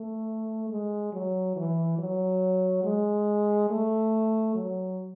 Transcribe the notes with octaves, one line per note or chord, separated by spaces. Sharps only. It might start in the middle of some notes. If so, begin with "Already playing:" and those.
Already playing: A3
G#3
F#3
E3
F#3
G#3
A3
F#3